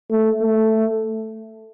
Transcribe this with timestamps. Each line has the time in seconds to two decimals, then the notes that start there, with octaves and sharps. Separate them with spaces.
0.10 A3
0.42 A3